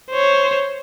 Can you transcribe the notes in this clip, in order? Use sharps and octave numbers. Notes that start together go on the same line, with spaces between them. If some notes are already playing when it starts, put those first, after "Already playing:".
C5 C#5